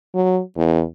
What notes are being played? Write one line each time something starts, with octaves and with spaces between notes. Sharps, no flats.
F#3
E2